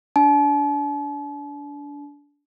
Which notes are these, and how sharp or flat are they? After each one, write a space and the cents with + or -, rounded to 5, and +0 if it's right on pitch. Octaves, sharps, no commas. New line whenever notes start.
D4 -25 A5 -45